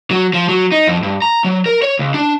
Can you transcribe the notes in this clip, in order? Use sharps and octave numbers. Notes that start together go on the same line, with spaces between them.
F#3
F3
F#3
D#4
F2
G2
A#5
F#3
A#4
C#5
C#2
D4